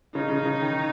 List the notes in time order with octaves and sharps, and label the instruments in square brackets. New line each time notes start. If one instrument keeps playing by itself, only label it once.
[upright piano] C#3 [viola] D#4
[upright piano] C#3
C#3
D#3